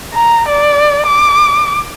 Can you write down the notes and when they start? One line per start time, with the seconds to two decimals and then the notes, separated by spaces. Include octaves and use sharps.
0.14 A#5
0.48 D5
1.06 D6